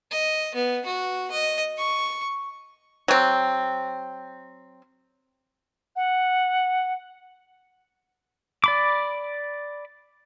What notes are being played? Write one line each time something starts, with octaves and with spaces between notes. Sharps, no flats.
D#5
B3
F#4
D#5
C#6
F#3 C4
F#5
D5 B5 D6